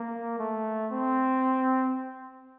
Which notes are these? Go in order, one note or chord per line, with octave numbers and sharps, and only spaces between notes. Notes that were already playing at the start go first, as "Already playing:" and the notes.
Already playing: A#3
A3
C4